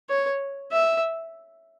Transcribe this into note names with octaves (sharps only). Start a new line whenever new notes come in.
C#5
E5